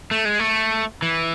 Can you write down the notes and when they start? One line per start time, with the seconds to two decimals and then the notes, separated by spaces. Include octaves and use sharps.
0.11 A3
0.25 G#3
0.40 A3
1.02 E3